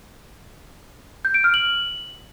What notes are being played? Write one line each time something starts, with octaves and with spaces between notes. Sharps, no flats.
G6
D7
F6
F#7